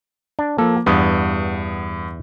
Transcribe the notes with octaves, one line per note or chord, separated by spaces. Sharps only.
D4
F3 A#3 A4
E2 G2 B3 D#6